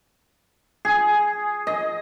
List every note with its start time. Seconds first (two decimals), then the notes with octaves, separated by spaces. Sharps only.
0.85 G#4
1.67 D#5